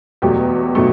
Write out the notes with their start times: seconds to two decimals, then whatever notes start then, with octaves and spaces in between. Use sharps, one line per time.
0.22 E2 B2 F#3 A3 G4
0.75 B2 F#3 A3